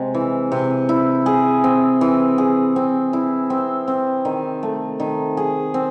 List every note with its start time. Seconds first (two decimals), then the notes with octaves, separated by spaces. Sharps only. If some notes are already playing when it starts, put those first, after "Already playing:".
Already playing: C3 G#3
0.14 E3
0.52 C3
0.89 E4
1.26 G#4
1.64 C4
2.01 E3
2.38 G#4
2.76 C4
3.13 E4
3.50 C4
3.88 C4
4.25 D#3
4.63 A3
5.00 D#3
5.37 G#4
5.74 C4